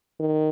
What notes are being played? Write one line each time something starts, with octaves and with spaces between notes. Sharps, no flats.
D#3